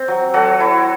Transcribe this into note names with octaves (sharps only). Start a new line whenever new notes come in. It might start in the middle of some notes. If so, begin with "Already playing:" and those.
Already playing: C4
F#3
F#3 F#4 A4
E4